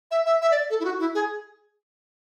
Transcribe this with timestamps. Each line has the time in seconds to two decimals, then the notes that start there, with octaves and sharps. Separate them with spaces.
0.11 E5
0.26 E5
0.42 E5
0.51 D5
0.70 A4
0.80 E4
0.85 F#4
1.00 E4
1.15 G#4